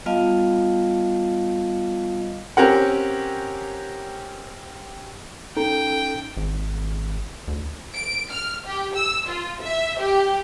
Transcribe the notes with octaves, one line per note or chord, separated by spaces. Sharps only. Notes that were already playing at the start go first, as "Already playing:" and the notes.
G3 B3 F4 D#5 F5 A5
C4 C#4 G4 A#4 F#5
C#4 D#4 A4 G5
G#1
D2
D7
F6
G4
E6
F4
E5
G4